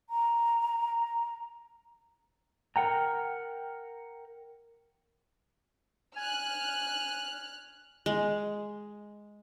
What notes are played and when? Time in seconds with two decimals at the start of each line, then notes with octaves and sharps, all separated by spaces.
0.10 A#5
2.76 A#4 F#5 G5 A#5
6.17 G#5 F6 F#6
8.06 G#3